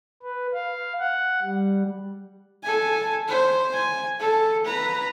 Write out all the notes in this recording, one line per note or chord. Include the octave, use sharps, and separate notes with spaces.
B4
F5
F#5
G3
A4 G#5
C5
G#5
A4
B4 A#5